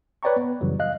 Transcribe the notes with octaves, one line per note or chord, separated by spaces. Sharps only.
B4 C#5 D5 G5 A#5 C#6
B3
F#2 C#3 E3 F#3 G3
D#5 F5 F#6